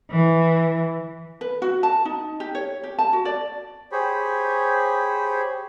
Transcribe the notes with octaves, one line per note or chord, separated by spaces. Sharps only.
E3
B4
F#4
A5
D#4
G4
C#5
G4
A5
F#4
D5
G4 G#4 C5 C#5 B5